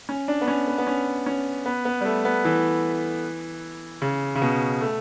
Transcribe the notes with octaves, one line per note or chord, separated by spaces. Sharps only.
C#4
D4
B3
C#4
B3
B3
C#4
C#4
B3
B3
G3
A3
B3
E3
C#3
C#3
B2
A3